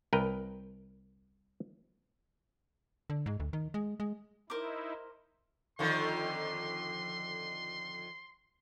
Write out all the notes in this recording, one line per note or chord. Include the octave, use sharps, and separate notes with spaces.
C2 A#4 B4 G5 A#5
D3
G#2
D2
D#3
G#3
G#3
D#4 E4 A#4 C5 D6
F2 D3 D#3 C6